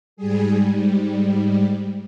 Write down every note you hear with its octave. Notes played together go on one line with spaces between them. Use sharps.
G#2 G3 G#4